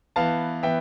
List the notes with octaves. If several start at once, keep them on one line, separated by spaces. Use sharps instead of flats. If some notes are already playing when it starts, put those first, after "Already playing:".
E3 B3 F5 A5
E3 B3 E5 G5